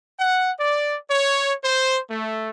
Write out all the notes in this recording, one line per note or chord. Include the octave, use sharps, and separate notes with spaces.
F#5
D5
C#5
C5
A3